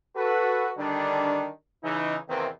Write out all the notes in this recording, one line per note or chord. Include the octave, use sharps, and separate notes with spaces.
F#4 A4 B4
D3 D#3 G3 D4
C#3 E3 D#4
E2 C3 D#3 A#3 C4 B4